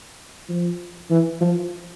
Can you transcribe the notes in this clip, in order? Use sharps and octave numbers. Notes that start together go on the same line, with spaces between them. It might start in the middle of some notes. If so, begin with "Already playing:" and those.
F3
E3
F3